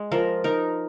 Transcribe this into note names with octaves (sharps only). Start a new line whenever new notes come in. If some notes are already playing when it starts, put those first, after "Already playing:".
Already playing: G#3
F3 A#4
D#4 A#4